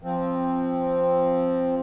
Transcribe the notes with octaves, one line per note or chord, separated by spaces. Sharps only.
F3 C4